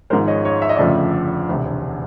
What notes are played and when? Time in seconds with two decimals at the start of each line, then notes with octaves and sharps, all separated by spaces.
0.10 G#1 G#2 F3 G#3 A#4 C5
0.28 C#5 D#5
0.45 C#5 D#5
0.62 E5
0.69 D#5
0.76 G1 F2 C#3 F3 A3 D5 E5
1.48 E1 D2 C3